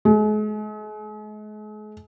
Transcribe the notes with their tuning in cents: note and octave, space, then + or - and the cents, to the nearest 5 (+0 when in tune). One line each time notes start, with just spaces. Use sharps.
G#3 +40